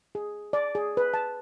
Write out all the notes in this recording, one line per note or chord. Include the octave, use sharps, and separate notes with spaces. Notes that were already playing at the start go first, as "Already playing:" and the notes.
G#4
D5
G#4
B4
A5